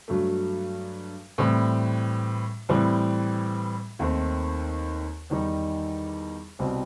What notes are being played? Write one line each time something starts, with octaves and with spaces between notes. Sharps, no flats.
G2 F#3 A3
A2 E3 G3 C4
A2 E3 G3 C4
D#2 D#3 A3 C4
E2 D#3 G3 D#4
C2 B2 G3 C4